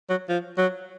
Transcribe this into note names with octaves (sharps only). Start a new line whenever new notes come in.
F#3
F3
F#3